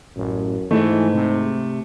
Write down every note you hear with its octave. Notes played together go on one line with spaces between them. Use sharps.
A1 F#2
G#2 E3 A3
C3